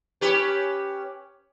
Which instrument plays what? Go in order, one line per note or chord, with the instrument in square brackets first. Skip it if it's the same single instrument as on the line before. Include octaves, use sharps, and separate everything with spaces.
[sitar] C#4 G4 B4